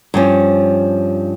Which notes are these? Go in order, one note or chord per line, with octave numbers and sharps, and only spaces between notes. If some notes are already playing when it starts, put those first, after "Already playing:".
G2 F3 C#4